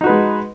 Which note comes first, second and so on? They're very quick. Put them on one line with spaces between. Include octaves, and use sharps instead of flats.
D#4 F#4 B4 G#3